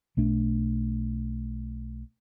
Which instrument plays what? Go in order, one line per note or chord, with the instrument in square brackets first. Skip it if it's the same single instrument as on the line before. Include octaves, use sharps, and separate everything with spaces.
[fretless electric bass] B1 A3 D4